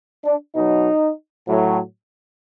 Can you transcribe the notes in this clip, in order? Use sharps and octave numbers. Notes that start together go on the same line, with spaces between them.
D4
B2 F#3 D#4
A2 F#3